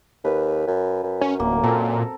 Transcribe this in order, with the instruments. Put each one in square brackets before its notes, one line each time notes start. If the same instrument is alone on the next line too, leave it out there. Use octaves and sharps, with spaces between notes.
[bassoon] D#2 [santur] B4
[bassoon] F#2
F#2
[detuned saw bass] C#4
[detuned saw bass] D1 [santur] A#3
[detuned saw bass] A#2 [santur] C4 A4 A#4